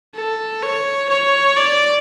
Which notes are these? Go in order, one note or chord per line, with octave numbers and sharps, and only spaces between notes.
A4
C#5
C#5
D5